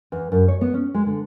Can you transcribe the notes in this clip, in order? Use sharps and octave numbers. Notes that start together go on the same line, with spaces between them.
E2
F#2
C#5
B3
C#4
G#3
D3